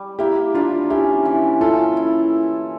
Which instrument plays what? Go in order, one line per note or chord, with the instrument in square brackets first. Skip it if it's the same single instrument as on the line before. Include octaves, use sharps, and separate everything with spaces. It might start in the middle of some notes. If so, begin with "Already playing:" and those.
Already playing: [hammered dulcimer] G3 C#5
[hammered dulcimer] A#3 [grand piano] E4 G4
[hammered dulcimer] A#3 [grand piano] D4 F4
[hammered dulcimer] C#4 [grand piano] E4 G4
[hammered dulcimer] E3
[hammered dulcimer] C#4 [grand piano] F4 A4
[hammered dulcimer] E4